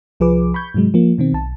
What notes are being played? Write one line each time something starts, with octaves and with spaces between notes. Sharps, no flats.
C2 F3 G#4 B4 D6
B5 C#6 G6 G#6
G#2 C3 F#3 G#3
F3 A#3
B2 D#3 C4
B1 A5